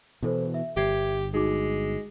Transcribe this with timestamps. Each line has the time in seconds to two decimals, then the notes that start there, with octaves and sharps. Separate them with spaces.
0.23 B2 E3 E4 A4 C5
0.54 E5
0.77 G1 G4 E5 G#6 C7
1.34 G#3 D#4 F#4 D6